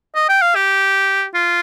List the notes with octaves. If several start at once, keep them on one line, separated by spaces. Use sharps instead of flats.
D#5
G5
F5
G4
F4